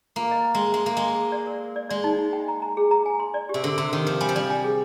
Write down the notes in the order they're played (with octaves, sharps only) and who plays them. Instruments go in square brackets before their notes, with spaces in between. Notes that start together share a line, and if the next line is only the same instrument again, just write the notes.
[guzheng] A#3 [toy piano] F4
[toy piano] D#5
G5
[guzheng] G#3
[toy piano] G5
[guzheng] G#3 [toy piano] C6
[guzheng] A#3 [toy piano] G#4
[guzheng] G#3
[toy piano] C6
C6
D5
A#4
A#4
D5
[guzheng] G#3 [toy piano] D5
[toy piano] D#4
D#4
G5
A#5
A#5
G#4
A#5
G#5
C6
D5
[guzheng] C3 [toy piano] G4
[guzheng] D3 [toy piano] A#4
[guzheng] C3 [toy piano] C6
[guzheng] D#3 [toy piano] A#4
[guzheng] F3 [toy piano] A#4
[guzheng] G3 [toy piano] G#5
[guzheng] F3
[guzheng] G3 [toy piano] D5
[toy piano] G#5
G#4